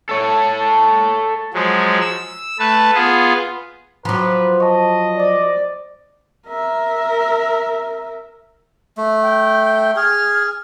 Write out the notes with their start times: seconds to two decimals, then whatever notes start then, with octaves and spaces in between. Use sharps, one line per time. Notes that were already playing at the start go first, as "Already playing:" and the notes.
0.09 A4 C#5
1.54 F3 F#3 G#3
2.00 E6
2.59 A3 B4 A5
2.94 B3 F4 G#4
4.05 F3 F#3 B4 A#5 C6 D6
4.60 D#5 A5 C#6
5.17 C5 D5 D6
6.48 A#4 E5
8.97 A3
9.22 G5
9.96 G#4 F6